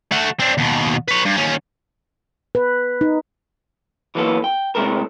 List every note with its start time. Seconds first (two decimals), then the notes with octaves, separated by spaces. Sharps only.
0.11 A3 F#4
0.40 C4 D4
0.58 D#2 B2
1.08 B4 C#5
1.26 G2
1.37 D#2 C#4
2.55 B4
3.01 D#4
4.15 E3 F#3 A#3 B3 A4
4.44 G5
4.75 A2 C3 G#3 A4 A#4